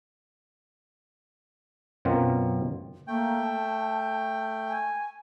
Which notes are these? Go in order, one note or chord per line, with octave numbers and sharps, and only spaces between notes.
F#2 B2 F#3 C4 F4 A#4
A3 A#3 G5
A5
G#5